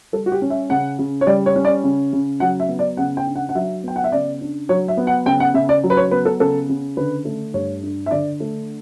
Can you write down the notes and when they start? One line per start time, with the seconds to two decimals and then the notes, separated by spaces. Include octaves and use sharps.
0.13 G3 A4
0.26 F#4
0.32 G4
0.42 C#4
0.50 E5
0.70 C#3 F#5
0.99 C#3
1.21 C#5
1.27 G3 D5
1.46 C#5
1.56 C#4
1.65 D5
1.84 C#3
2.13 C#3
2.40 F#3 F#5
2.60 E5
2.69 B3
2.79 D5
2.97 C#3 F#5
3.17 G5
3.27 D4
3.35 F#5
3.49 F#5
3.55 F#3 E5
3.84 B3 G5
3.96 F#5
4.04 E5
4.12 C#3 D5
4.41 D4
4.69 F#3 C#5
4.88 E5
4.97 B3
5.07 F#5
5.26 C#3 G5
5.40 F#5
5.54 C#3 E5
5.69 D5
5.83 F#3
5.90 B4
5.97 C#5
6.11 B3 B4
6.25 A4
6.40 C#3 A4
6.69 C#3
6.97 D3 B4
7.25 A3
7.54 G2 C#5
7.83 D4
8.06 E5
8.11 D3 D5
8.40 A3